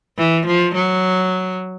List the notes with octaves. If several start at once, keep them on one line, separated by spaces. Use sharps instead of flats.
E3
F3
F#3